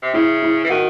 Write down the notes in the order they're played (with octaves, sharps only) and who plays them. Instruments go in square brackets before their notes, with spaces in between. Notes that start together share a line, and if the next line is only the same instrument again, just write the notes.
[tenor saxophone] C3
[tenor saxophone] C#3 [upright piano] E4
[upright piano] E4
[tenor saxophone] E3
[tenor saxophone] D#3 [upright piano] F#4